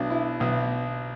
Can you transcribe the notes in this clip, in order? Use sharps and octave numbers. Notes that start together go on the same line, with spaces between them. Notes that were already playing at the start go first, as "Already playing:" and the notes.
Already playing: B1 B2 D4
E4
B1 B2